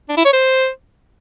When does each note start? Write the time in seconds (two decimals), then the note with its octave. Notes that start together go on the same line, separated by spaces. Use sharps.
0.09 D4
0.17 E4
0.25 C#5
0.33 C5